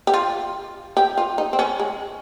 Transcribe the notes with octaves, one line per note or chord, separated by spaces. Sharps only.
G4
F4
G4
F4
D#4
C4
C#4
G#3